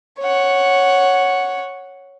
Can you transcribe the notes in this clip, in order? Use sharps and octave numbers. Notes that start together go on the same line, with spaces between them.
C#5 F#5